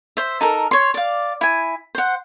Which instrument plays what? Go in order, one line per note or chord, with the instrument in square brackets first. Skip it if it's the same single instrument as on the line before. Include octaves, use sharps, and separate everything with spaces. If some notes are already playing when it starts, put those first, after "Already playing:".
[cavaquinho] C5 E5
D#4 A4 A#4
C#5 C6
D5 F5
E4 G#5
C5 F#5